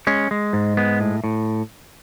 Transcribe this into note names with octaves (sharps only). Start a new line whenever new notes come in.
G#3 C#4
G#3
G#2
G#3 B3
A2
A2